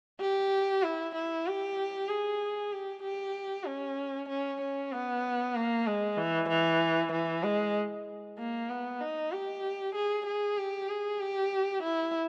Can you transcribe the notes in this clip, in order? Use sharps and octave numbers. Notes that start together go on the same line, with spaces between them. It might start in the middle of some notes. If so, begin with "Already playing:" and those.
G4
E4
E4
G4
G#4
G4
G4
C#4
C#4
C#4
B3
A#3
G#3
E3
E3
E3
G#3
A#3
B3
D#4
G4
G#4
G#4
G4
G#4
G4
E4